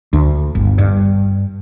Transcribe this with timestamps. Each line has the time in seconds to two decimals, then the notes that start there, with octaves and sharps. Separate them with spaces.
0.13 D2
0.55 G1
0.78 G2